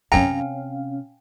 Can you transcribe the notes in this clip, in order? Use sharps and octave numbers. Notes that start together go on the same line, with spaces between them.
F#2 C3 C4 C#4 F5 G5 G#5 A#5